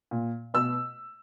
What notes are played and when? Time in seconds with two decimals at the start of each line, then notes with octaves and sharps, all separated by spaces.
0.11 A#2
0.54 B2 E6